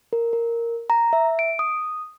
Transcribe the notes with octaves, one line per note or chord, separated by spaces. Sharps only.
A#4
A#4
A#5
E5
D7
D#6